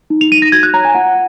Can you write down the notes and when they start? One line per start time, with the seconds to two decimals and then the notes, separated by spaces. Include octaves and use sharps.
0.10 D#4
0.21 F7
0.31 D#4 D#7
0.42 A#6
0.52 F#4 G#6
0.63 F#6
0.73 C#5 A#5
0.85 G#5
0.95 F4 F#5